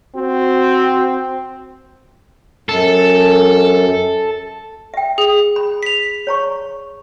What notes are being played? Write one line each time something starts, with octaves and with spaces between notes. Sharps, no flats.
C4 F#4
F#2 A4
E5 G5
G#4
B5
B6 F7
C#5 A#5 C#6